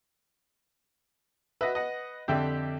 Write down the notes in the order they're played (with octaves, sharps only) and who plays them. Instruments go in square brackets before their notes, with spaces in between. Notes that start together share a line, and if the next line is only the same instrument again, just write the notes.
[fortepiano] F#4 D#5 E5 [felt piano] B4
[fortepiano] D#5 F#5
[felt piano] F2 D3 [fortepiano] G4 E5 G5